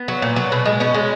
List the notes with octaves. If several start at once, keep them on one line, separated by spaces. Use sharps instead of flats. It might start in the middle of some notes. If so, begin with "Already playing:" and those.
Already playing: B3
F#3
A#2
F#3
B2
G#3
B2 C#4
G#3